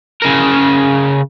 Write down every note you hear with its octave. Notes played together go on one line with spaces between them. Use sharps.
C#3 A#4